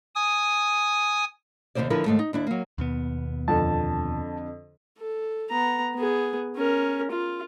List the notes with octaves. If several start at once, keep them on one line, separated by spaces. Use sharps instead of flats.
G#5 D#6
D#2 C3 D#3 F#3 C5 D5
D3 F3 E4 F4 A#4 B4
D#2 G#2 A3
D#4
D#2 D4 E4
F#3 A#3
D#2 B2 B3
F2 D3 A5
A4
B3 A#5
B3 G#4
C#4 A#4
F4